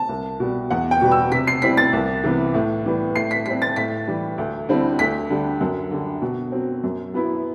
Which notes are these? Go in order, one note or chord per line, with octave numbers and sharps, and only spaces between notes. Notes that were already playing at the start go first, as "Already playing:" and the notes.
Already playing: A5
C2
B2 G3
E2 F#5
G5
B2 G3 B3
E6
C3 B6
C7
G3 C4 E4 B6
A6
C2
C3 E3 B3
A2
E3 G3 B3
A2 C7
B6
G3 C4 B6
A6
A2 B6
E3 G3
D2
D3 G3 C4 E4
D2 B6
D3 G3
F#2
D3 G3
B2
F#3 C4
F#2
F#3 B3 E4